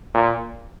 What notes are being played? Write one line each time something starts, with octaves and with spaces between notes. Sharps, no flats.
A#2